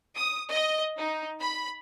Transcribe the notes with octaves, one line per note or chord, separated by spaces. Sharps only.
D#6
D#5
D#4
B5